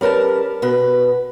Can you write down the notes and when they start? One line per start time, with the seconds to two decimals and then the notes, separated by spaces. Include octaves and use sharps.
0.01 G3 C#4 A#4 B4 A5
0.62 B2 B4